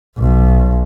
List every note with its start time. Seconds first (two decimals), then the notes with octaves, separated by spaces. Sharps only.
0.18 B1